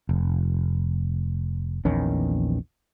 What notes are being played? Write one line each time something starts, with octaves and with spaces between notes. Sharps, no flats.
F1
A#1 E2 D#3 C#4